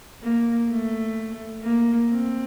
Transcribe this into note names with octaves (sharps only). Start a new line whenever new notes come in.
A#3
A3
A#3
C4